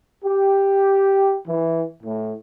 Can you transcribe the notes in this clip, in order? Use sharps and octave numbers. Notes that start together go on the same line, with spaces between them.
G4
E3
A2